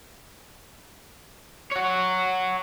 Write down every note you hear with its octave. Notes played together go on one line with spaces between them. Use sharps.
C#5 F#5